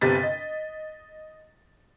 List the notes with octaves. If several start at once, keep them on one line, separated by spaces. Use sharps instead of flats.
G1 C3 B3 A6 B6
D#5